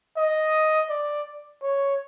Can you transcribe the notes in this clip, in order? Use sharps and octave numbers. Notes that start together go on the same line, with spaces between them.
D#5
D5
C#5